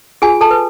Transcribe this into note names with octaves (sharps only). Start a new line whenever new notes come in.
F4 G#4 G#5
A4 A5
B4